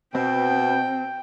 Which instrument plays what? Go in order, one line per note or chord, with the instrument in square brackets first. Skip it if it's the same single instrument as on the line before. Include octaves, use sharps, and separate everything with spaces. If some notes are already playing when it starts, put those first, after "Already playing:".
[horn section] B2 [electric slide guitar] C4 [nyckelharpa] G5